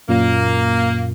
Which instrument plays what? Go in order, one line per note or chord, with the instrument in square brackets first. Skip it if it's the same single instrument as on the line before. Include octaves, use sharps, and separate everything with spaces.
[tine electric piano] F#2 A#2 [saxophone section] A#3